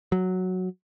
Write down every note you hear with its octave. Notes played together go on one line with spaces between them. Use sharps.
F#3